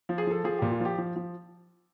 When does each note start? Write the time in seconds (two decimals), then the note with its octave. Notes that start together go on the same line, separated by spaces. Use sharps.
0.09 F3
0.18 G#4
0.27 F3 A4
0.44 F3 G#4
0.58 A#2 G4
0.71 F4
0.80 F3 G4
0.98 F3
1.16 F3